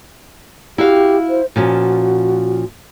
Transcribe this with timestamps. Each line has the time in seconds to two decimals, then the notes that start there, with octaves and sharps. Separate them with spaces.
0.78 E4 F#4 G4 F5
1.29 C5
1.56 A#2 F3 C#4 F#4